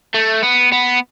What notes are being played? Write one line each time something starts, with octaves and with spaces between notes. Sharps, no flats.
A3
B3
B3